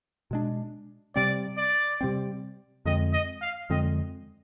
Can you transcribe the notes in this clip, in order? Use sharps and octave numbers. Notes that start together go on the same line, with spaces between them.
B2 G#3 D4
C3 G3 C4 D5
D5
C3 G3 C4
F2 D3 G#3 C4 D#5
D#5
F5
F2 D3 G#3 C4 D#5